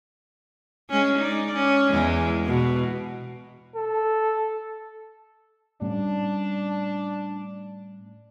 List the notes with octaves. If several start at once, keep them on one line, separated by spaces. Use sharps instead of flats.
G#3 C#4
D#4 D5
C#4
E2 G#3
B2
A4
A2 G3 C#4 D4